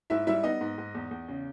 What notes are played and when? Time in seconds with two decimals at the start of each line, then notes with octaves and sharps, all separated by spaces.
0.10 G#2 E4 E5
0.27 G3 E4 E5
0.43 B3 D#4 D#5
0.61 G#2
0.78 G#2
0.95 E2
1.11 E2
1.28 C#3